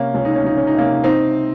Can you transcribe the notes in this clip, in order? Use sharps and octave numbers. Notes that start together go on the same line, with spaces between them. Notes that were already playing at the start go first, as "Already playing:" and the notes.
Already playing: C3 A#3 C#4
C#2 C#4
D#4
C#4
C#2 D#4
C#4
D#4
C3 A#3 C#4
C4 D#4